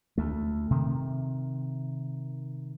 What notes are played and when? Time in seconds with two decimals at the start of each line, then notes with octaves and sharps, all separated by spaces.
0.18 D2 A3
0.71 C3 D#3